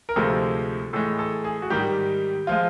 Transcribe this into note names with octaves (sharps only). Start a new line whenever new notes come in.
A#4
D2 C3 F3 G#3 A4
A2 E3 G#3 A4
A4
G#4
F#4
G#2 D#3 G3 G4
F3 G#3 F4